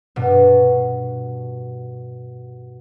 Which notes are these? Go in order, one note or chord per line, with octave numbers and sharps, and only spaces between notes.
G2 B2